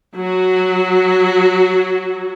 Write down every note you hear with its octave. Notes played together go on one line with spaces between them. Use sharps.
F#3 F#4